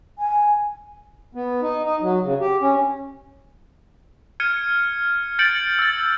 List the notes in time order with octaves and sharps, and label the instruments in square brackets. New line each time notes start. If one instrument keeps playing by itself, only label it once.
[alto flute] G#5
[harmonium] B3
D#4
D#4
F#3
C#3
G4
C#4
[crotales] F6 G#6 C#7 D#7
G6 A6 C#7 D7 F#7
E6 A6